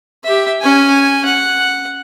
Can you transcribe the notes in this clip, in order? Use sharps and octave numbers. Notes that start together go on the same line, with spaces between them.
G4 E5
C#4 G#5
F#5